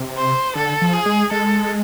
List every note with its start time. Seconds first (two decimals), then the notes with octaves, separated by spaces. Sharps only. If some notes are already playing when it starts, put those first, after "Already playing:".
Already playing: C3
0.17 C5
0.56 D3 A4
0.82 F3
0.93 G#4
1.06 G#3
1.31 G#3 A4